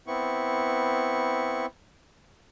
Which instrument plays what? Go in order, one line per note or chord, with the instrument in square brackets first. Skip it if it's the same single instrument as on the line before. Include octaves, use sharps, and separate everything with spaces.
[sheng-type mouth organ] B3 C4 E4 C#6